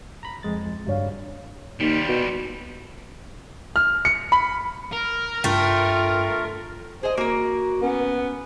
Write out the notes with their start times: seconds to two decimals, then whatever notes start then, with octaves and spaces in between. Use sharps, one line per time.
0.23 A#5 B5
0.43 F2 G#3 A6
0.87 G2 C#5 F5
1.80 D#2 G3 F4
2.08 B2
3.76 F6
4.05 C#7
4.32 B5
4.92 A#4
5.44 G2 A3 F4 G5
7.03 G#4 C5 D#5
7.17 A#3 F#4 A#4
7.82 B3 C#4